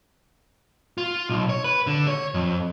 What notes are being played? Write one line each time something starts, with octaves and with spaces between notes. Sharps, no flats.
F4
B1
C#5
B4
D3
C#5
F2